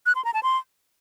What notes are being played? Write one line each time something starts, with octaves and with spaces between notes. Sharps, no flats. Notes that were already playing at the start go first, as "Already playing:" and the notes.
F#6
C6
A#5
A5
C6